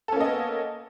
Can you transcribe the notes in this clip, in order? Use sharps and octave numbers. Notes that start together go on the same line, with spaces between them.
A#3 B3 C#4 A4 D#5